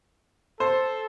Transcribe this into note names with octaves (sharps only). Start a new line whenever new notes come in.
A4 C5